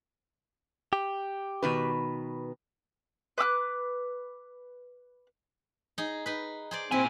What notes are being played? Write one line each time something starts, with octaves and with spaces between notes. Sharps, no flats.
G4
B2 D#3 B4
B4 D6 E6 F#6
D#4 G#4
D#4 B4
G#4 C5 D5
A#2 C4 C#4 E4 G#5